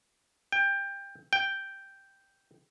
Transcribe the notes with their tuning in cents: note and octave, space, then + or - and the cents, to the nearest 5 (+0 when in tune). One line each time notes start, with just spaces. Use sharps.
G5 +20
G5 +0